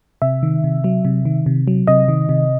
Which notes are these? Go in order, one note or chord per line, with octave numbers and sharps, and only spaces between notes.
C3 E5
D#3
C3
F#3
C3
D#3
C3
F#3
C3 D#5
D#3
C3